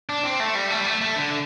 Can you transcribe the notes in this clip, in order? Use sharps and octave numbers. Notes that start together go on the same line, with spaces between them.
D4
C4
A3
G3
A3
G3
A3
A3
D3